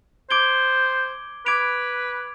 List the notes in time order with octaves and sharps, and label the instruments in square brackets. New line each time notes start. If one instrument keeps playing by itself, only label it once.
[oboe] C5 [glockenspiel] D6 G#6 D7 G7
[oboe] B4 [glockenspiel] D6 G#6 D7 F7